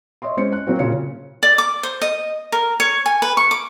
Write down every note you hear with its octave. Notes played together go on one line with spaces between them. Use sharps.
C#5 D#5 E5 C6
G#3 C#4 C5 C#7
F#6
F#3 A#3 C4 F#4
A#2 C#3 A#4 C#7
D5
D6
C5
D#5
A#4
C#5
G#5
B4
C#6
D6